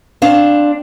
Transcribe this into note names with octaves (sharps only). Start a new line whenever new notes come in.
C4 D4 F5